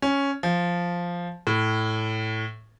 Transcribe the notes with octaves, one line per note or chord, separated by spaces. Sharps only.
C#4
F3
A2